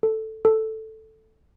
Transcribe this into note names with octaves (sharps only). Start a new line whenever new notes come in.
A4
A4